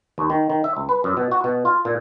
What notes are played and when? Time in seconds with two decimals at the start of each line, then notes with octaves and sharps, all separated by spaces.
0.18 D#2
0.30 D#3
0.50 D#3
0.64 E5
0.77 C#2
0.89 B4
1.04 F#2
1.17 B2
1.32 F#4
1.44 B2
1.65 F4
1.85 A#2